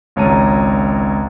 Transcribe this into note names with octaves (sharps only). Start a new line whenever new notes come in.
G#1 C#2 C#5 A5 A#5 D#7